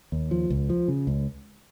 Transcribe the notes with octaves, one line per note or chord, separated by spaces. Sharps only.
D#2
F3
C#2
F3
C#3
C#2